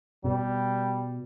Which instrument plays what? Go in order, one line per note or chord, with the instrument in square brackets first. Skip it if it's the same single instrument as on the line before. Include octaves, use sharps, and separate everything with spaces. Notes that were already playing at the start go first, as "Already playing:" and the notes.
[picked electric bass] B2 [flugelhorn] G3